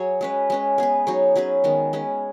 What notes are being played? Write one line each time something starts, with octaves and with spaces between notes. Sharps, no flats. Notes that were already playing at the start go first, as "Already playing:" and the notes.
Already playing: F#3 G#4 C#5
G#3 C#4 B4
G#3 C#4 B4
B3 G#4 B4
F#3 D#4 G#4 C#5
F#3 C#4 G#4 B4
D#3 G#3 B3
G#3 C#4 B4